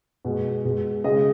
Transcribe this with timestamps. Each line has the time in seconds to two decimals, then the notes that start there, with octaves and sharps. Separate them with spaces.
0.25 B2 G#3
0.65 B2 G#3
1.04 C#3 G#3 D#5